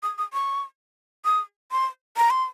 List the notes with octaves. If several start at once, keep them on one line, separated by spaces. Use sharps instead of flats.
D#6
D#6
C#6
D#6
C6
A#5
C6